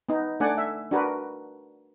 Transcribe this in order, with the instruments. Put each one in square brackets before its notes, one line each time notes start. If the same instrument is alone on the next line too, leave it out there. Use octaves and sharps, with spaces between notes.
[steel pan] B3 D#4
A3 D4 D5 F#5 G#5
E5
D4 F#4 A#4 B4